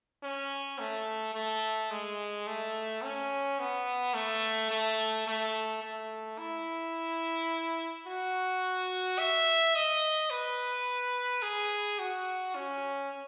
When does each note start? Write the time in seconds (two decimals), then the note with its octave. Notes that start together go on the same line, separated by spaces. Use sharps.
0.23 C#4
0.79 A3
1.34 A3
1.91 G#3
2.47 A3
3.02 C#4
3.59 B3
4.14 A3
4.71 A3
5.27 A3
5.82 A3
6.38 E4
8.07 F#4
9.18 E5
9.75 D#5
10.30 B4
11.42 G#4
11.99 F#4
12.55 C#4